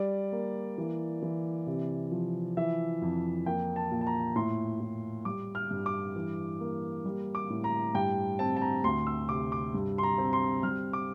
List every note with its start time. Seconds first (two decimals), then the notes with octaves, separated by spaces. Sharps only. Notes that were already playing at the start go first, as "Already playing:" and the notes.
Already playing: G3 D5
0.32 A#3
0.78 E3
1.22 E3
1.67 C3
2.12 F3
2.57 E3 E5
3.02 F2
3.46 A#3 G5
3.76 A5
3.91 A#2
4.01 A5
4.07 A#5
4.36 A2 C6
4.80 A2
5.25 G3 D6
5.55 F6
5.71 G2
5.86 D6
6.16 E3
6.60 A#3
7.05 G3
7.35 D6
7.50 A2
7.64 A#5
7.95 G2 G5
8.39 C4 A5
8.57 A5
8.62 A#5
8.84 D2 C6
9.07 E6
9.29 C3 D6
9.52 D6
9.74 G2
9.98 C6
10.03 A#5
10.18 C4
10.33 C6
10.63 G3 F6
10.93 D6